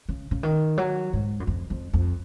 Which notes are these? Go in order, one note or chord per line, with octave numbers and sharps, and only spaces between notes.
C#3
C#3
D#3
F#3
G#2
F#2
F2
F2
F2